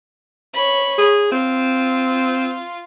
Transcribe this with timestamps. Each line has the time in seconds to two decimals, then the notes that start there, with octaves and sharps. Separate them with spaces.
0.53 C#5 B5
0.98 G#4
1.32 C4 F4